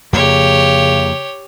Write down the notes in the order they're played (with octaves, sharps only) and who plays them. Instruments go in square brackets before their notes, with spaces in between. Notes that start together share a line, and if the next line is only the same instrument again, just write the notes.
[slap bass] F2 A#3 [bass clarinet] C#3 [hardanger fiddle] G4 C#5